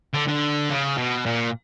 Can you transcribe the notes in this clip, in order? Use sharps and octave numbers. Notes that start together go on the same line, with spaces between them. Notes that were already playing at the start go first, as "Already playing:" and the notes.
D3
D3
C#3
B2
A#2